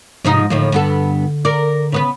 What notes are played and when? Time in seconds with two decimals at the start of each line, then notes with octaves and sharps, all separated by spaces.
0.25 G#2 C3 F3 D#4
0.50 D#2 A2 D3 F3
0.72 G2 B3 A4
1.45 A#4 D5
1.92 C#3 B3 B4